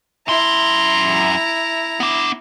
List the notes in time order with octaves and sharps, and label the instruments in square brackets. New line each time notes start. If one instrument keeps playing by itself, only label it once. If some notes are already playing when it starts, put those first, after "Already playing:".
[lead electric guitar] F#2 C6 [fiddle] E4 A#5
[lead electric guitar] B3 D4